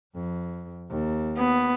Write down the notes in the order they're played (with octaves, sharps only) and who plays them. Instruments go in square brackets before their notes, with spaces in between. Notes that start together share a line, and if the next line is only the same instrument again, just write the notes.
[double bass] F2
D#2
[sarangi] B3